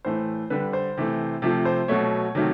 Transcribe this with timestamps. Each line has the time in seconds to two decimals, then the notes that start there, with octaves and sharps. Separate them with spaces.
0.05 A2 E3 A3 C5
0.50 D3 G3 B4
0.73 C5
0.97 C3 E3 A3
1.42 C3 F3 A3
1.65 C5
1.88 B2 F#3 A3 C#5
2.35 C3 D#3 F#3 A3